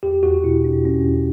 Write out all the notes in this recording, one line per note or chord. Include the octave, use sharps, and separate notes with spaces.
E2 G4
E2 F#4
B2 E4
B2 D4
E2 C#4
E2